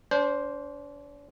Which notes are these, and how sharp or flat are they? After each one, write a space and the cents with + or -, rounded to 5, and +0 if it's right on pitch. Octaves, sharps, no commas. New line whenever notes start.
D4 -40 C5 +0